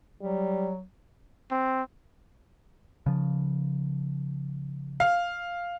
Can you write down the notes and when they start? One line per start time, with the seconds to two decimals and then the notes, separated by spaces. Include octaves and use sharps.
0.22 F#3 G3
1.51 C4
3.06 C#3 F3
5.00 F5